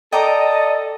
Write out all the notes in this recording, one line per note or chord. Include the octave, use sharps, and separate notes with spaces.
A4 D5 D#5 G5 A#5 D6